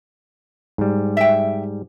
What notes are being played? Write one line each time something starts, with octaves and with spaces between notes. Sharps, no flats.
G#2 G3
E5 G5